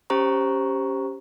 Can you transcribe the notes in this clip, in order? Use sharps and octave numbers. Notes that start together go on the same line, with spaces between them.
C#4 G4 C5 A#5 C#6